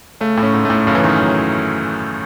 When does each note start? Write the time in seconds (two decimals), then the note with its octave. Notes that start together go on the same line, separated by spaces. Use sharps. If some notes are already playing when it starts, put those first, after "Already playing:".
0.21 C#3 A3
0.37 A2
0.43 C#4
0.53 G#2
0.65 A2 A3
0.87 F#2 C#3
0.95 E3
1.04 D#3 C#4
1.20 F#3